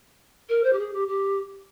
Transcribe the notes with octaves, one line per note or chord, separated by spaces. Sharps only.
A#4
C5
G4
G#4
G4
G4